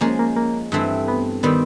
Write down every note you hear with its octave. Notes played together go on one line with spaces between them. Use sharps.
F3 G#3 A#3 C#4
A#3
A#3
G2 E3 A3 C4
B3
D#3 G3 B3 C4